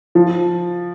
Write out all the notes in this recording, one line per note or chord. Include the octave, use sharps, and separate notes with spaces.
F3